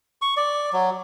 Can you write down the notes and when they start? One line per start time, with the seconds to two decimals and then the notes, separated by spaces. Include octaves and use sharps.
0.22 C#6
0.37 D5
0.73 F#3